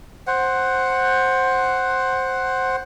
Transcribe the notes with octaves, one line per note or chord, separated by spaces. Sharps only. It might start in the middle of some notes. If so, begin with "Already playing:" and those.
C5 F#5